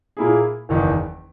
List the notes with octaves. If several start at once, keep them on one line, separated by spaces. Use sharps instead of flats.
A#2 A#3 E4 G#4
F#1 E2 D#3